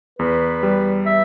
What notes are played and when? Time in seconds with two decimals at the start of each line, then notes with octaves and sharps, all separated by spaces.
0.19 E2 B4
0.63 G3
1.06 E5